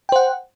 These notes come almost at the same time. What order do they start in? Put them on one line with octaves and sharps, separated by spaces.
G5 C5 F#5